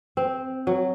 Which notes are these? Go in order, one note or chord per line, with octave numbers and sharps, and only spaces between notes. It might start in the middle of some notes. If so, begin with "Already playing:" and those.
C4
F#3